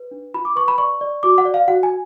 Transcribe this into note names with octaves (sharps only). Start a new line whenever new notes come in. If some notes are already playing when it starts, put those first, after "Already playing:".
Already playing: B4
D4
F4 B5
D6
B4 C#6
B5
D5 C#6
D5
F#4 D6
F#5
D5
F5
F#4 F#5
G#5